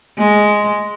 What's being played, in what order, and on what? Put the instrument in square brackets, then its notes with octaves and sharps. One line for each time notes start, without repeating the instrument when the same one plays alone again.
[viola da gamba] G#3